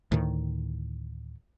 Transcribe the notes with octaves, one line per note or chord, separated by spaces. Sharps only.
D2 A2 D#3